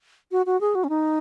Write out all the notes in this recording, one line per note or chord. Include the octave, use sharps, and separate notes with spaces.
F#4
F#4
G#4
F#4
C#4
D#4